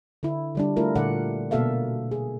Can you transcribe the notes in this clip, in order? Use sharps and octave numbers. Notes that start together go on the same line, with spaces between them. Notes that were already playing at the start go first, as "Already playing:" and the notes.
D3 E4
D3 G3 D4
A3 E4 F4 A#4
A#2 D3 D5 F#5
B2 A#3 A4 E5 F5
G#4